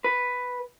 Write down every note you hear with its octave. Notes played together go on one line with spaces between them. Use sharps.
B4